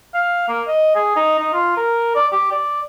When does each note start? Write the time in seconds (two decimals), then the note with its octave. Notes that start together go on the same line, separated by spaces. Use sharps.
0.14 F5
0.48 A#3
0.67 D#5
0.95 G#4
1.16 D#4
1.39 D#4
1.53 F4
1.77 A#4
2.15 D5
2.32 G4
2.51 D5